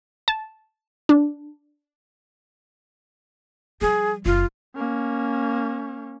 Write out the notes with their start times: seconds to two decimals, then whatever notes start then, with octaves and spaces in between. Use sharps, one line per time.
0.28 A5
1.09 D4
3.81 F3 G3 G#4
4.26 F#1 F4
4.75 A#3 C#4